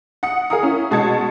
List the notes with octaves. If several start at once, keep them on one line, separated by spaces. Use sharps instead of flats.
F#5 D#6 C#7
G#4 A#4 F5 G#5 A#5 D#6
C#4 E4
B2 G#3 A5 G#6 C#7